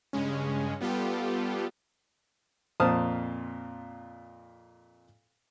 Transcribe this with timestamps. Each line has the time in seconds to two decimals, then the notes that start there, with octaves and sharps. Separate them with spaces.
0.13 G2 C#3 G#3 C#4
0.80 G3 B3 F4 G4 A4
2.80 F2 A#2 C4 A5 D#6 F6